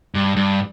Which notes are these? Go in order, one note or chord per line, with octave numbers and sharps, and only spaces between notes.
G2
G2